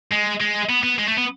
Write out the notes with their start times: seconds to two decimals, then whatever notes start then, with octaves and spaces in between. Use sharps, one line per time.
0.11 G#3
0.41 G#3
0.70 B3
0.83 B3
0.99 G#3
1.08 A3
1.18 B3